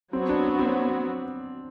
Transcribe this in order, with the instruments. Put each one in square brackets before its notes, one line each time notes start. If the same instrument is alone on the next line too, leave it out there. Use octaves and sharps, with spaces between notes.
[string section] F#3 B3 F#4 [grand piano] C4
[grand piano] D4
D4
C4